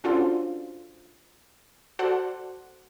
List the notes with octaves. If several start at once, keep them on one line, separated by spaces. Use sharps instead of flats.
C#4 D4 F4 F#4 A4 C5
F#4 A4 C5 D5 F#5